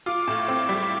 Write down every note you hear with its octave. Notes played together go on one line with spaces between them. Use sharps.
F4 D6
A2
C4
G3